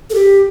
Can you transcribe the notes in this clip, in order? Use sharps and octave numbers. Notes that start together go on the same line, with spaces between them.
A4
G4